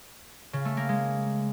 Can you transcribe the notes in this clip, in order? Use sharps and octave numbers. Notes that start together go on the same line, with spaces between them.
C#3
A3
A#3
G#3